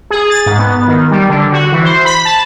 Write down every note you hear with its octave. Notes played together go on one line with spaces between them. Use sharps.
G#4
A6
G#2
B3
D#3
G3
D3
F#4
E3
C5
B5
A5